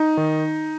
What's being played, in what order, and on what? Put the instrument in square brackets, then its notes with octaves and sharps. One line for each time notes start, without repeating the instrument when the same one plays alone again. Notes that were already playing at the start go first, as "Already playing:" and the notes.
Already playing: [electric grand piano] D#4
D#3